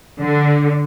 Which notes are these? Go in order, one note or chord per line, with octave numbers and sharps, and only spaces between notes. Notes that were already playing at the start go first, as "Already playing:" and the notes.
D3